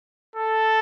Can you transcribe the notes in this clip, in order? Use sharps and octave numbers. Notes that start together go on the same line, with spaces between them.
A4